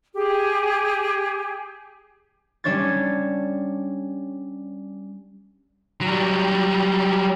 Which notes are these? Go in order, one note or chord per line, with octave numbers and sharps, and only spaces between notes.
G4 G#4
G3 C#4 D4 C#5 G#6 A6
F#3 G3